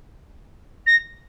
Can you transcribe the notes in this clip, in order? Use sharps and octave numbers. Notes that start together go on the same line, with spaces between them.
A#6